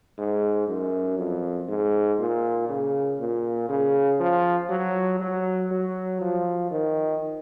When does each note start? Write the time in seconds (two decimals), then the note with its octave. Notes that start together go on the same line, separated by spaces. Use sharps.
0.18 G#2
0.68 F#2
1.18 F2
1.68 G#2
2.19 A#2
2.69 C#3
3.19 A#2
3.69 C#3
4.20 F3
4.70 F#3
5.20 F#3
5.71 F#3
6.21 F3
6.71 D#3